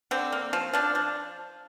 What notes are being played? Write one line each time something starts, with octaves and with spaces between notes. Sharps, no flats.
D3 C4
A#3
F3
F3 D4
F3 D4